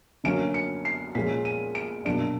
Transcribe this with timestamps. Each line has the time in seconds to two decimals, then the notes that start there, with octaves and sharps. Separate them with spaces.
0.24 D3 F#3 A#3 C#4 D7
0.54 C#7
0.85 C7
1.15 A#2 F3 G#3 C#4 B6
1.45 D#7
1.75 D7
2.05 B2 F#3 A#3 D4 D7